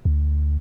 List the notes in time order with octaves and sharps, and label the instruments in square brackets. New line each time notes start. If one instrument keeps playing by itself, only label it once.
[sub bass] D2